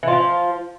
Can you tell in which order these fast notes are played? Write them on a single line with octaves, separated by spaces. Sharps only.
E3 F4 F3